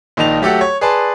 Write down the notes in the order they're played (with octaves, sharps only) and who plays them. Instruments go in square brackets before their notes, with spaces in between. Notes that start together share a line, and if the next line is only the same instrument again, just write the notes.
[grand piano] A#1 D#3 D#4 A5 F7
F#3 A3 G4 A4 F#5
C#5
G#4 B4 D5 A5 C6